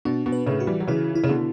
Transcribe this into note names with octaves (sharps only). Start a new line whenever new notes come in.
B2 D4
B2
B4
A2 C#3
F#4
E3 G3
F#3
C#3 E3 E4
E4
C#3
B2 D3